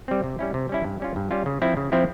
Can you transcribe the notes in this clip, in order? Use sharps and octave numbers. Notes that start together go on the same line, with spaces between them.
G3 C4
C3
G3 C#4 E4
C3
G3 C#4 E4
G2
G3 C#4 F4
G2
G3 C#4 F4
C#3
F3 C4 E4
C#3
F3 C4 E4